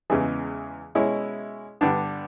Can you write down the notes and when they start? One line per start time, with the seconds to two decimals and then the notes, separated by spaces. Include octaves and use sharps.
0.10 E2 C#3 E3 G#3
0.95 B2 G#3 C#4 E4
1.81 G2 D3 G3 B3 D4